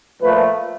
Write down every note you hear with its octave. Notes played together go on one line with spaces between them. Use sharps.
A#2 F3 A3 B4